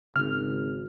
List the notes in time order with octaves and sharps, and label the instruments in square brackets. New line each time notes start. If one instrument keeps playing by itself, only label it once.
[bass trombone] G#1 [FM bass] C#3 [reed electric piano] F6